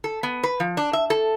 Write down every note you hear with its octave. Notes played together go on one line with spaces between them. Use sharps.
A4
B3
B4
F3
D4
E5
A4